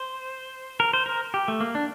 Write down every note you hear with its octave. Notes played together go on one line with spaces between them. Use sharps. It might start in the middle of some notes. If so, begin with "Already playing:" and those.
Already playing: C5
A#4
C5
A#4
G4
A3
A#3
D4